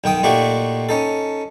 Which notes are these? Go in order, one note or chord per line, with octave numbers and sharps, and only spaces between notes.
B1 D#3 G5 D#6
A#2 A3 D#4 F#4 G4
C#4 D#4 A4